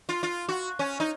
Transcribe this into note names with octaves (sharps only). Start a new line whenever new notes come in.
F4
F4
F#4
C#4
D#4